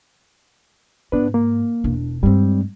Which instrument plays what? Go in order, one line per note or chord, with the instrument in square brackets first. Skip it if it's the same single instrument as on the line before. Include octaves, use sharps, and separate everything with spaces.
[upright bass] G#2 [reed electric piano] B3 D4 B4
[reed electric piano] A#3
[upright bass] E1 D4
[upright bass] G2 G#3 [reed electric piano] G3 C4